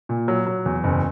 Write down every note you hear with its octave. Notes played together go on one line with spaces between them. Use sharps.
A#2
F#3
F#3
E2
F#1